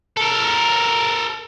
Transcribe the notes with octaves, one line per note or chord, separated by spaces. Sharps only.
A4 A#4